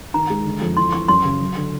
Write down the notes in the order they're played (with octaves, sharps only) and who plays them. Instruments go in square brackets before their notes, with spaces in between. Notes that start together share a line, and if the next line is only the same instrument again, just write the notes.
[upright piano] D#3 [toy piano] A#5
[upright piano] G#3
D3
F2
[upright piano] E3 [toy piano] C6
[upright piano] E3 [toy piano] C#6
[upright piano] F#2 [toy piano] C6
[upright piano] C#3
F#3
D3